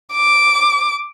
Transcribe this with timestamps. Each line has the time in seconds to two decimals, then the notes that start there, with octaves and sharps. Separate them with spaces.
0.14 D6